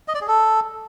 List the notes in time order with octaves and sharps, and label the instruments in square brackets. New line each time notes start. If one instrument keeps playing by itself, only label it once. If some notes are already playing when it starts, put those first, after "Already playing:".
[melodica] D#5
D5
G#4
A4